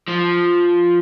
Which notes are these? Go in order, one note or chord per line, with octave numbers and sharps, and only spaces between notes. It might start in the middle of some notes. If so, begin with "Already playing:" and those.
F3